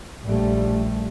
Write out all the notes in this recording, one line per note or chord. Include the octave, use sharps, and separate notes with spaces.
A#1 G3 A3